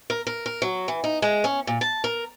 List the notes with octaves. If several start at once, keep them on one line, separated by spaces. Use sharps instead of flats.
A#4
A#4
A#4
F#3
E3
D#4
G#3
C#4
A#2
A5
A#4